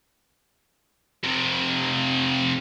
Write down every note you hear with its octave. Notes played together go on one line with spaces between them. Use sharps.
F2 C3